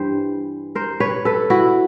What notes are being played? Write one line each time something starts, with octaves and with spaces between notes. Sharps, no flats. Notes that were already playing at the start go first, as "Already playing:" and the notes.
Already playing: G2 E3 G3 C5
A#4 C5
B4 C#5
A4 B4
E4 F#4